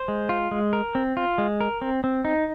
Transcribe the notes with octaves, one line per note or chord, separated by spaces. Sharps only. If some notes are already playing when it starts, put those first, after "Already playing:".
Already playing: C5
G#3
F4
G#3
A#4
C4
F4
G#3
A#4
C4
C4
D#4